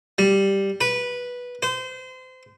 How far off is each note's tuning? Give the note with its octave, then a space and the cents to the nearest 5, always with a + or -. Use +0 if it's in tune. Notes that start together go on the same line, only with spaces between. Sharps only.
G3 +0
B4 -10
C5 -30